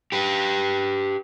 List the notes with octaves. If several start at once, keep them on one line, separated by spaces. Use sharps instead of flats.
G4 B4